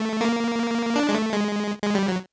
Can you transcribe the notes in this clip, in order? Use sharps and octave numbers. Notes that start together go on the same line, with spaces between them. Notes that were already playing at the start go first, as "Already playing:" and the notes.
Already playing: A3
A#3
D4
G#3
A3
G#3
G#3
G3
F#3